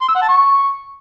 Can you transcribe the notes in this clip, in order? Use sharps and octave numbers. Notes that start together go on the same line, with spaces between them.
C6
E6
F#5
A5
C#6